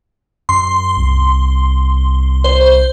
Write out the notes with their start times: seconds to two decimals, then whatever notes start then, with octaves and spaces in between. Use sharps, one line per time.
0.49 F#2 C6
0.97 C2
2.44 C5